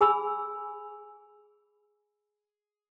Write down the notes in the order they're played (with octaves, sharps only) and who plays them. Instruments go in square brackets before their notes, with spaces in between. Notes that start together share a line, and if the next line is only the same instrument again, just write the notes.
[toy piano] G#4 G#5 B5 E6